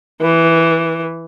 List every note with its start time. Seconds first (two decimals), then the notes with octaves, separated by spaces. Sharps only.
0.21 E3